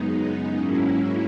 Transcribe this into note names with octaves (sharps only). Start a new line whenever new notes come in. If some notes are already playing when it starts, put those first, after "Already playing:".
Already playing: F#2 C#3 G#3 B3 D#4
G#2 F#3 A#3 C#4 E4